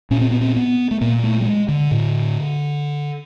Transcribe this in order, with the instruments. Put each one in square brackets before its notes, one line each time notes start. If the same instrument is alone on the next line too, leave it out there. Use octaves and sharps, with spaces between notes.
[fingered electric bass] A#2 C#4
C4
B3
C4
B3
A3
A#2 A#3
A3
G3
G#3
D3
A2